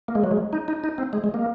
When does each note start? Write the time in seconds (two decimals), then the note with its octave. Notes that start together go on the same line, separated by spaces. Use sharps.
0.08 A#3
0.15 G#3
0.24 F#3
0.31 G#3
0.53 D#4
0.68 D#4
0.84 D#4
0.98 C4
1.13 G#3
1.24 G#3
1.34 A#3